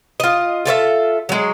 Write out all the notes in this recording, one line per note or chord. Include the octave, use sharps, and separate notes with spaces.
F4 D#5
F4 A4 C#5 E5
F#3 G#3